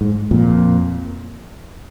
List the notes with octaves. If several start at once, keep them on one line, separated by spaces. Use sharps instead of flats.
G#2
F2 A#2